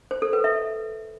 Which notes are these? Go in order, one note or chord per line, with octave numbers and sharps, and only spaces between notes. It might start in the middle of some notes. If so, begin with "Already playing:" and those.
C5
A4
B4
E5